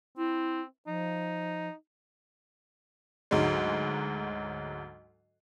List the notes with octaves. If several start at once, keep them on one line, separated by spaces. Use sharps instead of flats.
C4 E4
F3 D#4
D2 G#2 F#3 G#3